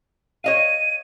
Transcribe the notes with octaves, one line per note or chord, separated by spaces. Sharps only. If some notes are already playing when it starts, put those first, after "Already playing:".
C#5 D#5 F5 D#7